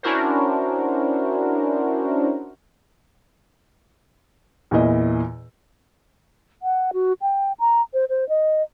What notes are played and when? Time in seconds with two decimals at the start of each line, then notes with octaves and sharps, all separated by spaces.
0.03 C#4 D4 E4 F#4 A#4 C5
4.71 E2 A#2 E4 D#5
6.63 F#5
6.93 F#4
7.22 G5
7.59 A#5
7.93 C5
8.09 C5
8.29 D#5